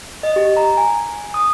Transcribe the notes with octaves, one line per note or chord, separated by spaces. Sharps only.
D#5
G4
A#5
G#5
D#6